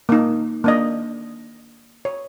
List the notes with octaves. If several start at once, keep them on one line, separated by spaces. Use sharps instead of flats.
A#3 D#4
A#3 D4 D#5
C#5